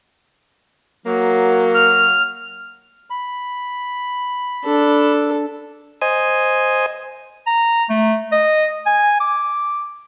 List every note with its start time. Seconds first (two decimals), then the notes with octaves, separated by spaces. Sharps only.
1.06 F#3 A#3
1.75 F6
3.10 B5
4.64 D4 A4
6.02 C5 D#5 G#5
7.47 A#5
7.90 A3
8.32 D#5
8.86 G#5
9.20 D6